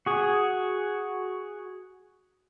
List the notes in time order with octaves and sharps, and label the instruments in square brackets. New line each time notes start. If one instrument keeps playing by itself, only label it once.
[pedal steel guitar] F#4 G#4